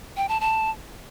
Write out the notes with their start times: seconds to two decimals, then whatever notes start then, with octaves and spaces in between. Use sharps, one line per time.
0.17 G5
0.29 A5
0.41 A5